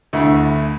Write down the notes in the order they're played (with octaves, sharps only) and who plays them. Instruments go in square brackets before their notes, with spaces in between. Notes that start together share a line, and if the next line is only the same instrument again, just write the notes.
[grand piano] D2 D3 A3 E4